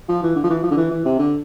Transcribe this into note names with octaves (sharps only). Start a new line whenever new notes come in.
F3
E3
D3
F3
E3
F3
D3
E3
E3
C3
D3